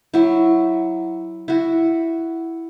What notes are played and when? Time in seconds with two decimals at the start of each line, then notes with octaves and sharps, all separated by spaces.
0.14 F#3 E4
1.48 E4 F#4